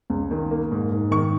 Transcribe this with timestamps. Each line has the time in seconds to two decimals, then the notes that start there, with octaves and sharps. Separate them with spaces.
0.10 C#2
0.31 D#3
0.51 A#3
0.71 G#2
0.92 G#2
1.11 D#3 C#6